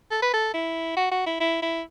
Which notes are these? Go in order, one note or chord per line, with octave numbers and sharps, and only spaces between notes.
A4
B4
A4
E4
F#4
F#4
E4
E4
E4